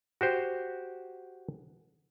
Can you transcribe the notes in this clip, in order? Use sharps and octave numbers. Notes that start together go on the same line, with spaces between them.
F#4 G4 C5